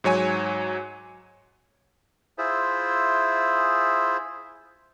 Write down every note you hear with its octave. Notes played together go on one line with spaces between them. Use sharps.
G#2 F#3 C#5 G#5
E4 F4 G#4 C5 E5